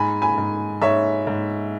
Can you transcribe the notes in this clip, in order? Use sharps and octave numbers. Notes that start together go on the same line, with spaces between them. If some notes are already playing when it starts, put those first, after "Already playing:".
Already playing: G#2 G#5 B5
G#5 B5
G#2
G#2 C#5 E5
G#2